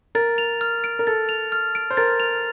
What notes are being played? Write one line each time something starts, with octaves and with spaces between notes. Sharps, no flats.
A#4 A6
F7
F6
D7
A#4
A4 A6
F7
F6
D7
C5
A#4 A6
F7